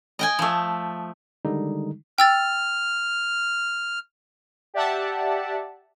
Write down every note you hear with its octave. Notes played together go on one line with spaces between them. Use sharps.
D#5 G5 G#5
F3 A3
D3 D#3 G3 G#3 D#4
G5 E6 F6 A6
G4 D5 E5 F#5 A5